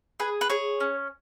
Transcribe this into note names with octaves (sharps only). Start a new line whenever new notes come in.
G#4 B4
B4
G#4 C#5
C#4